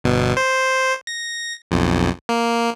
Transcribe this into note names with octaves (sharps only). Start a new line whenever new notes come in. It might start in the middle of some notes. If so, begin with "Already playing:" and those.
G1 B2
C5
A#6
B1 F2
A#3